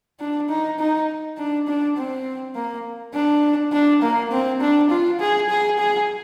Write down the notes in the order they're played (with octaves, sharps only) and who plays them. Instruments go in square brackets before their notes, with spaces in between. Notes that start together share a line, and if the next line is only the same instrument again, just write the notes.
[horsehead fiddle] D4
D#4
D#4
D4
D4
C4
A#3
D4
D4
A#3
C4
D4
F4
G#4
G#4
G#4